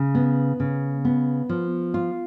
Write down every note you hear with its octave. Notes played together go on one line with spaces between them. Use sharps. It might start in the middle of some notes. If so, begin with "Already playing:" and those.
Already playing: C#3
B3
C#3
B3
F3
F4